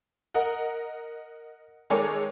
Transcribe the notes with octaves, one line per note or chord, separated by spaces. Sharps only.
A#4 D#5 F#5
D#3 G#3 G#4 A4 C#5 D6